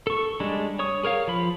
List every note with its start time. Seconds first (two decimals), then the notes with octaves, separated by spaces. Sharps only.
0.07 A4 C#6
0.40 G3 G#3 D4
0.79 C#5 C#6 D#6
1.03 G#4 A#4 C#5 F5
1.28 F3 B5